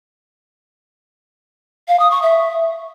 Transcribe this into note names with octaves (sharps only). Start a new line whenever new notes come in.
F5
D#6
C#6
E5